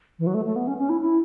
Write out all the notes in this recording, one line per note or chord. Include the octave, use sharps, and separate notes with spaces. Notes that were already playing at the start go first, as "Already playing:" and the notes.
E3
F#3
A3
A3
B3
C#4
C#4
E4
E4